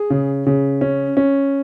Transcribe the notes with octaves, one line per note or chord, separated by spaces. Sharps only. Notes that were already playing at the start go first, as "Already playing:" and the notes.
Already playing: G#4
C#3
C#3
C#4
C#4